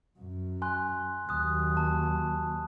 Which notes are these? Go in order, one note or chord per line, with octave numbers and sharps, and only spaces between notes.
F#2
G#5 C6 F#6
D#2 F#3 D#6 F#6
A5